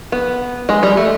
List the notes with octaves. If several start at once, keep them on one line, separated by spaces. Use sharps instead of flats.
B3
G#3
G3
A3